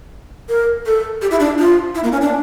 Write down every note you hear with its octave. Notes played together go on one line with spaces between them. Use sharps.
A#4
A4
G4
E4
D4
F4
E4
A#3
C#4
D4